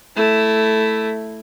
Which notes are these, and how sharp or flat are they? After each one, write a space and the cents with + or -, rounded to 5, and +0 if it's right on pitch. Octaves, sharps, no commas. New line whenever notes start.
A3 +0 E4 +0